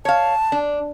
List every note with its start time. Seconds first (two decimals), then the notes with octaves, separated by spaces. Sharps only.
0.05 C#5 F5 A5
0.52 D4